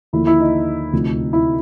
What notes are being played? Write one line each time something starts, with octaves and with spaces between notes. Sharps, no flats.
D#2 D3 F3 E4
E4
D#4
D2 C3 F3
E4